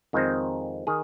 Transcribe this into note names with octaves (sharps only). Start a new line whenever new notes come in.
F2 D#3 G#3 C4 D#4
D#3 G#4